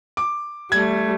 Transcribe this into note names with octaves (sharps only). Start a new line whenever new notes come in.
D6
G3 A3 G#6